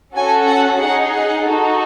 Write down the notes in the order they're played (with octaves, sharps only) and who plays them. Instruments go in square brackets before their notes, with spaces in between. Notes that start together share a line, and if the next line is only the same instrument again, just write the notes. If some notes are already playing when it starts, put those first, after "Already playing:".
[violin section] C#4 F#4 A4 G#5
F#5
D#4 G#4 F#5
F#5
D#4 F#4 A4